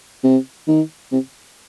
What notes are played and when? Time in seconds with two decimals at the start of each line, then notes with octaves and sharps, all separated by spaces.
0.24 C3
0.68 D#3
1.12 C3